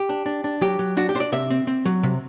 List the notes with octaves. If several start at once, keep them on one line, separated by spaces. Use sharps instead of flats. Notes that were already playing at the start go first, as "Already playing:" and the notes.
Already playing: G4
D4
D4
D4
F#3 G4
F#3
D4 F#4
G4
D4 C5
D5
C3 E5
C4
C4
F#3
C3